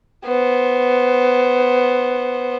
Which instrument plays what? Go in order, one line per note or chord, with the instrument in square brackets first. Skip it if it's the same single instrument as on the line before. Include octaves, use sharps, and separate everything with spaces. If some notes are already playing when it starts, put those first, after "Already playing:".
[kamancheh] B3 C5